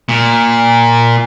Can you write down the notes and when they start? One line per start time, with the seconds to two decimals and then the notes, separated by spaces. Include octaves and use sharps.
0.09 A#2